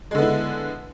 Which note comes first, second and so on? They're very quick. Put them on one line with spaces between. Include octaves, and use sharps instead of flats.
G#3 D3 B3 E4